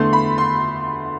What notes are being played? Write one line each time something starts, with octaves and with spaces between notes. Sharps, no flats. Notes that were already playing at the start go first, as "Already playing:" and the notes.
Already playing: E2 D3 A3 C6
B5
C6